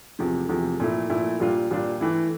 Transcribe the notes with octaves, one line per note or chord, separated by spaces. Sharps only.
E2 C3 F3 A3
E2 C3 F3 A3
A#2 F3 A3 E4
A#2 F3 A3 E4
A#2 G3 D4 F4
A#2 G3 D4 F4
E3 A3 E4